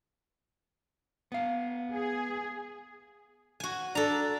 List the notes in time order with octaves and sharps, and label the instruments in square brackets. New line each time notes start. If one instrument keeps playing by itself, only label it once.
[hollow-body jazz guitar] B3 F5
[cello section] G#4
[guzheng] F#4 G#5
[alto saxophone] D4 [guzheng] A4 A#5